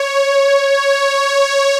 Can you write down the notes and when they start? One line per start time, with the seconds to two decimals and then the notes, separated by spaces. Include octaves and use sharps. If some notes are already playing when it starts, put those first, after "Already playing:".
Already playing: C#5
0.72 C#5